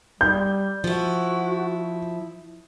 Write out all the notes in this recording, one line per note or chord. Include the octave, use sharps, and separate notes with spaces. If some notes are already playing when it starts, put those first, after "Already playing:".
G3 G6
F3 E4 F#4